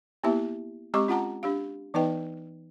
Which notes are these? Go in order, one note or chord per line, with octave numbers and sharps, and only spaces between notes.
A#3 B3 E4 G4 E5
G#3 C4 G4 D#5 C#6 D6
C#4 F4 F#5 A5 A#5
D4 G4 F5
E3 B3 D#4 B4 D#5 G5